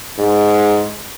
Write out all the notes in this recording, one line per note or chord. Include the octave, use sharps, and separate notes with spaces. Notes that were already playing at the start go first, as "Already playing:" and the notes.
G#2